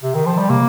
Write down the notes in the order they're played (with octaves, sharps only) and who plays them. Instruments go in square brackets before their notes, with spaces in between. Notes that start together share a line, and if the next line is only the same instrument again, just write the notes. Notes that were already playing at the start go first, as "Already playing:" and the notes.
[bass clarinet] C3
D#3
F3
G3
[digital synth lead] C3 [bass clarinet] A#3